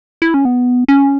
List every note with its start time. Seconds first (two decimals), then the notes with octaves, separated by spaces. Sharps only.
0.22 E4
0.34 C#4
0.45 B3
0.88 C#4